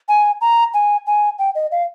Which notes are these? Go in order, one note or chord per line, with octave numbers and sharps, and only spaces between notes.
G#5
A#5
G#5
G#5
G5
D#5
F5